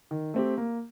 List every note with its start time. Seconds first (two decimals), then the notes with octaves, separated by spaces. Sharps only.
0.11 D#3
0.34 A3 C4 G4
0.58 A#3